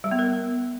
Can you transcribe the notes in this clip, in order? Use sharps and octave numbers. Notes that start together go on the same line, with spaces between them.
G3
B3
A#4